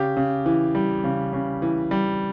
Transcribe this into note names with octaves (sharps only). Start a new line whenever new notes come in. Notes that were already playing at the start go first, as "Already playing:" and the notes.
Already playing: C#3 G4
C#3
E3
G3
C#3
C#3
E3
G3